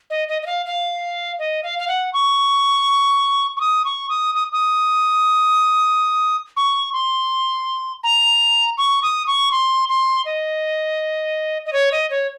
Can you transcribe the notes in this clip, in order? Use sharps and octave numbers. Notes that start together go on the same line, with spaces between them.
D#5
D#5
D#5
F5
F5
D#5
F5
F5
F#5
C#6
C#6
D#6
C#6
D#6
D#6
D#6
C#6
C6
A#5
C#6
D#6
C#6
C6
C6
D#5
D#5
C#5
D#5
C#5